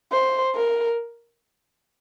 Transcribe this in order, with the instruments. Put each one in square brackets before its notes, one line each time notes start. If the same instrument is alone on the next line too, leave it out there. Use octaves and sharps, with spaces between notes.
[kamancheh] C5
A#4